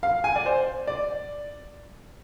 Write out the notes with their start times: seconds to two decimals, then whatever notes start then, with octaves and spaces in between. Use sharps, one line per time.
0.03 F5
0.24 G#5
0.36 D5
0.46 C5
0.87 D5